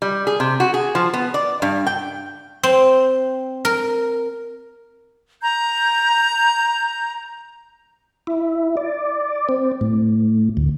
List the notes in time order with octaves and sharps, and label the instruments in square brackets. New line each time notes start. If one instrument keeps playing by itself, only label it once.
[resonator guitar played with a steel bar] G3
G#4
C3
F#4
G#4
F3
B3
D5
G2
G5
[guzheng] C4
A#4
[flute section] A#5 G6
[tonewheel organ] E4
D5
C4
A2
D2